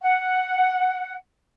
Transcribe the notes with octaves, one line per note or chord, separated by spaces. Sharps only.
F#5